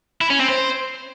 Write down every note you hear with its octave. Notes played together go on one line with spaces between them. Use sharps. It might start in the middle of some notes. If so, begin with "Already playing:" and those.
E4
C#4
C4
C5